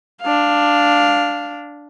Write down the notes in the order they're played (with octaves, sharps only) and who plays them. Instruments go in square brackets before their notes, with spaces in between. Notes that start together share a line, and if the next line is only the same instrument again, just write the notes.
[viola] D4 F5